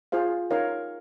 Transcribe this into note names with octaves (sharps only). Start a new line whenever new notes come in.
F4 G#4 C5 F5
D#4 A#4 C#5 F5